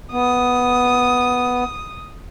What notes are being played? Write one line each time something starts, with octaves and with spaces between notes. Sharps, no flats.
B3 D#6